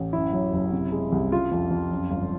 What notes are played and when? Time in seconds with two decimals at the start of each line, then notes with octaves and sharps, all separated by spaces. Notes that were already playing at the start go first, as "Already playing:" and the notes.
Already playing: A1
0.13 F#2 E4
0.33 F#3
0.53 F#1
0.72 C3
0.92 G#3
1.12 C2
1.31 C#3 F4
1.51 F2
1.71 F2
1.91 F#2
2.11 G1